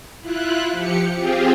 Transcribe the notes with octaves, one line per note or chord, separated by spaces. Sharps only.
E4 F4 F#6
F3 G4 C#7
C4 F4 G4 G#4